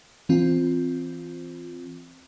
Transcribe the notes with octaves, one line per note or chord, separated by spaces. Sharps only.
E3 C4 F4